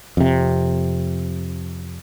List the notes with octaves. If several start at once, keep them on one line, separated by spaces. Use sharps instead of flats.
F2 C3